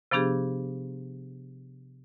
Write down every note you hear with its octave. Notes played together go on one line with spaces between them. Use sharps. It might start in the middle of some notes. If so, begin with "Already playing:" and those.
C3 F3 B3 D4 G4 G#4